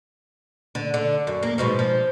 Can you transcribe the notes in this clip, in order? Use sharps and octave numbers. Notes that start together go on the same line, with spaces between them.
D3
D3
F#2
A#3
G#2 B2 F3
F3